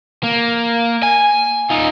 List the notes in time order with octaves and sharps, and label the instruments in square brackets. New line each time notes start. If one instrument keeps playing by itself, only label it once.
[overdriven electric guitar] A#3
G#5
D#4 F4